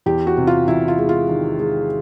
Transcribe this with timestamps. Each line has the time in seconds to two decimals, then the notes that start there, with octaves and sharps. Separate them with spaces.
0.06 E2 G4
0.27 F#4
0.37 C3
0.47 F4
0.67 E2 E4
0.88 F4
0.99 G#3
1.09 F4
1.29 D#3
1.60 G#3